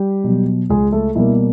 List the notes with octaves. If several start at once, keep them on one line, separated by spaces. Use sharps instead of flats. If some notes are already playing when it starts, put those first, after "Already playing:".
Already playing: G3 G4
B2 F#3
C#2 G#3 G#4
A3 A4
B2 G3 A#3 E4